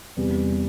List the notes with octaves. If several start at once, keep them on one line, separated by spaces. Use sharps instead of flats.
E2 C3 G3